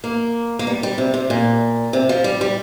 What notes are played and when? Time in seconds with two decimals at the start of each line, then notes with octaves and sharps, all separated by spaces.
0.04 A#3
0.59 A#3
0.67 G3
0.83 G3
0.98 C3
1.14 C3
1.30 A#2
1.93 C3
2.09 F3
2.24 G3
2.41 G3